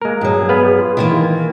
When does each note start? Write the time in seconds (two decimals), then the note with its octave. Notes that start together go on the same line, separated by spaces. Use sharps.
0.02 G#3 A#3 A#4
0.21 G2 F#3 G#4
0.49 B3 B4 F5
0.77 F4
0.97 D#3 E3 A#3